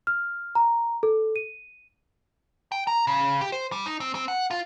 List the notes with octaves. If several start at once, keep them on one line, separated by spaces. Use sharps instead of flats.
F6
A#5
A4
D#7
G5
A#5
C#3
G4
C5
G3
D#4
C4
C4
F#5
F4